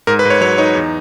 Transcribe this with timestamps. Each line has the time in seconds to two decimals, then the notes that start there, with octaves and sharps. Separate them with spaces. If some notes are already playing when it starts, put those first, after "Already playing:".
0.07 G#2 A#4
0.19 B4
0.25 G#2
0.30 C#5
0.41 F#3 C#5
0.58 D#4 C#5
0.75 E2